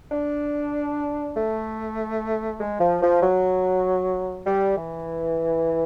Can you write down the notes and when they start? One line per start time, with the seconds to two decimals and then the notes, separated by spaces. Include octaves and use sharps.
0.12 D4
1.37 A3
2.60 G#3
2.80 F3
3.02 F3
3.22 F#3
4.46 G3
4.77 E3